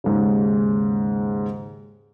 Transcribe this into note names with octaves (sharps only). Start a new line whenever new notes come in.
D#2 G#2 C#3